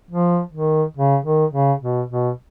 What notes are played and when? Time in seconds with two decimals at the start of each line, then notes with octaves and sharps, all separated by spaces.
0.11 F3
0.53 D#3
0.97 C#3
1.25 D#3
1.53 C#3
1.82 B2
2.10 B2